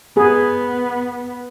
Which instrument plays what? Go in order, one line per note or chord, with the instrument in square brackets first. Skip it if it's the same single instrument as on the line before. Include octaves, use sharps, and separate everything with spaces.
[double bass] B3 [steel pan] G#4